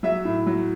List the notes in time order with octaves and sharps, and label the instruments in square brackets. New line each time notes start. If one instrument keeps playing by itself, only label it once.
[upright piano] F#3 E5
A2
F#3